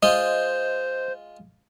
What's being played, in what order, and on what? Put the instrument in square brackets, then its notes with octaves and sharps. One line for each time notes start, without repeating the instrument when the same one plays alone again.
[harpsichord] G#3 F4 [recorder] C5 [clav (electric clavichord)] D#5